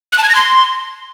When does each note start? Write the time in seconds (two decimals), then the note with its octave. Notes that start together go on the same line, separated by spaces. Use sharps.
0.12 F#6
0.18 A5
0.24 G#6
0.29 A#6
0.35 C6